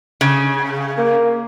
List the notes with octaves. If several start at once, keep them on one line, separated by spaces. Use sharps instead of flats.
C#3
A#3